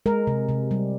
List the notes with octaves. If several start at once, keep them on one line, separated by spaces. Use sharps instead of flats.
G#3 A#4
C3
C3
G3